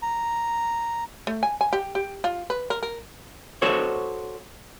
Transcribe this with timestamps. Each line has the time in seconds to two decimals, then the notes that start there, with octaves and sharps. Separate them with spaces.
0.02 A#5
1.27 A3
1.43 G#5
1.61 G#5
1.73 G4
1.95 G4
2.24 F4
2.50 B4
2.70 A#4
2.83 A#4
3.62 F#4 A4 C5 C#5